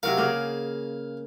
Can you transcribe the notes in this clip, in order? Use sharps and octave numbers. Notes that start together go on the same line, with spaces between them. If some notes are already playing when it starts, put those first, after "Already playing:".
C3 F#3 A#4 F5
C#3 A#3 G#4